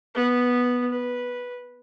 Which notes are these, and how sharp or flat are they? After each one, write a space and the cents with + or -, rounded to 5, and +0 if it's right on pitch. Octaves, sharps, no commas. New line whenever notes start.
B3 -5
B4 -10